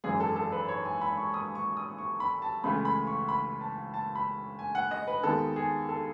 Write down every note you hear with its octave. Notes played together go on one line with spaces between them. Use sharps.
G#1 F#2 E3 G#4
A4
A4
B4
C#5
G#5
B5
C#6
D#6
C#6
D#6
C#6
B5
A5
C#2 C#3 E3 A3 B5
B5
C#6
B5
A5
A5
B5
G#5
F#5
D#5
B4
D#2 D#3 G#3 B3 A4
G#4
A4